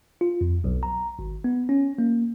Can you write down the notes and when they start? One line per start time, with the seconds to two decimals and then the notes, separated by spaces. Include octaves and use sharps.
0.21 F4
0.41 F2
0.64 B1
0.83 A#5
1.19 G#1
1.44 B3
1.69 C#4
1.98 A#3